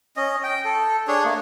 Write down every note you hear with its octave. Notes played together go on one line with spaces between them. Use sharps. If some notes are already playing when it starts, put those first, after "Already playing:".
C#4 D#5
G5
A4
D4 G#4 C#5
A3 A#3